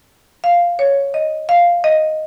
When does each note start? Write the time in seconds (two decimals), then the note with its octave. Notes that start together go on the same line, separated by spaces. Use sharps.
0.44 F5
0.79 C#5
1.14 D#5
1.49 F5
1.84 D#5